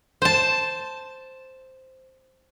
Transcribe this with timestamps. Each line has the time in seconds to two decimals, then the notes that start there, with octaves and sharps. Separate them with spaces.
0.22 C5 A5